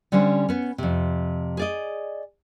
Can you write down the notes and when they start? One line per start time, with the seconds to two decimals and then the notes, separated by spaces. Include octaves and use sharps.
0.12 D3 G3 C#4 D4 C5
0.49 B3 C#4
0.78 F2 C3
1.57 G#4 D5 D#5